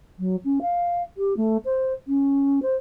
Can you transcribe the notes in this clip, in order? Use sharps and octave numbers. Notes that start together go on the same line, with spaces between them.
F#3
C#4
F5
G4
A3
C5
C#4
C5